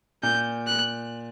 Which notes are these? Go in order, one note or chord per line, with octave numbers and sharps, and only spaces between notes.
A#2 G6
F#6